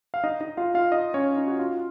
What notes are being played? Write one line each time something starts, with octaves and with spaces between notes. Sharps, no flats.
F5
D#4 D#5
D#4 D#5
F4 F5
F4 F5
D#4 D#5
C#4 C#5
D#4
F#4
F4